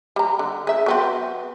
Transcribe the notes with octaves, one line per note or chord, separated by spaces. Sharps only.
G3 A#5
D3
G#4 E5
F#3 B3 C4